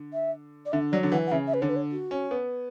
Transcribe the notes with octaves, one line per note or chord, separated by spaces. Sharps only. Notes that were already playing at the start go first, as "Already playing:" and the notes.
Already playing: D3
E5
D5
D3 E5
F#3 D5
D3
E3 F#5
F#5
C#3 E5
E5
B4
D3 C#5
B4
C#5
F#4
C#4
B3